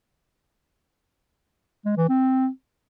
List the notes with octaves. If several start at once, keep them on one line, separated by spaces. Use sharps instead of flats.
G#3
E3
C4